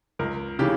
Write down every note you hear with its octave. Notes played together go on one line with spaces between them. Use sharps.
C#2 A#4
C#3 E3 G4